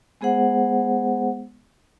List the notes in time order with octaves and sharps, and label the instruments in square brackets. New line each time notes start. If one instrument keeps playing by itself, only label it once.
[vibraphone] G#3 B3 G#4 C5 F#5